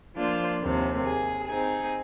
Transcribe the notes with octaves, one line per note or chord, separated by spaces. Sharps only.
F3 A#3 D4 F4 C5
D#2 C3 C4
G#4
C4 D#4 G#4